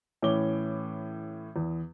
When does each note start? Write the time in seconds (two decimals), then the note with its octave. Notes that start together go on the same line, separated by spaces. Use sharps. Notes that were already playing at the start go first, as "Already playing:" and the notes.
0.22 A2 E3 C#4 D6 G7
1.56 E2